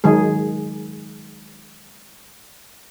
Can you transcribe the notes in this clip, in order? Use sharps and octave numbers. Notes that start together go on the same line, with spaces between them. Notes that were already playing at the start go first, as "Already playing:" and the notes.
D#3 F#3 G#3 G#4